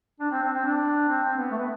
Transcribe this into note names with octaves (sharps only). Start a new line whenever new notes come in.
D4
C4
C4
C4
D4
C4
C4
B3
A3
B3